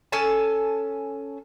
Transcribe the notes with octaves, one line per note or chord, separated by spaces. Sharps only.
C#4 A4 G#5 A5